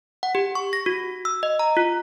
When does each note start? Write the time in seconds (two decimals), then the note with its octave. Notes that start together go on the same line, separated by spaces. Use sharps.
0.23 F#5
0.35 G4
0.55 C#6
0.73 A#6
0.86 F#4
1.25 E6
1.43 D#5
1.59 A#5
1.77 F4